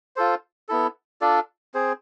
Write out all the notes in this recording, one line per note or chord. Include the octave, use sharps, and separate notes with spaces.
F4 A4 C5
B3 E4 A4
D4 F4 A4 D5
C4 G#4 C5